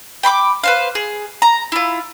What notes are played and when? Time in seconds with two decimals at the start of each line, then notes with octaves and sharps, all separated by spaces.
0.23 G5 B5 C6 D6
0.63 B4 C5 F5
0.95 G#4
1.42 A#5
1.72 E4 F4